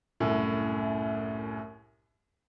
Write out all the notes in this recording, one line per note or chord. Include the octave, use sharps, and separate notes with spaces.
C2 F#2 A2